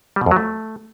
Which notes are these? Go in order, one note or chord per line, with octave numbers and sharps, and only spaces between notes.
G3
B2
F2
F#3
A3